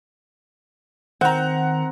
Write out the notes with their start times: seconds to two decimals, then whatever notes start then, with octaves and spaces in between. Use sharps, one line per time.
1.21 D#3 C4 F#5 A#5